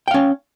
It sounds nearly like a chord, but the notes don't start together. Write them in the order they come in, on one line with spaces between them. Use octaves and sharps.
G5 F5 C#4